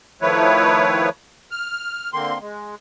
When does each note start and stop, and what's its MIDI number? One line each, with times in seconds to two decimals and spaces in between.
0.22 1.09 51
0.22 1.09 53
0.22 1.09 57
0.22 1.09 64
0.22 1.09 71
0.22 1.09 73
1.51 2.10 89
2.13 2.38 50
2.13 2.38 58
2.13 2.38 60
2.13 2.38 84
2.41 2.75 56